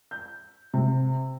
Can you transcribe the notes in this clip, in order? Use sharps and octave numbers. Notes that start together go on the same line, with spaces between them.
G6
C3